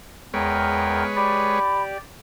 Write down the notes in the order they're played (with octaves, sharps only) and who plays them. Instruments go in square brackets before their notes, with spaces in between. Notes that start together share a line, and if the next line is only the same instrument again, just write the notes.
[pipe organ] E2 A#4 G5 [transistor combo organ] G#3 B4 C#5
[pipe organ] G4 D5 [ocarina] B5